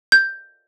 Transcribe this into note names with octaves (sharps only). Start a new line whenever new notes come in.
G6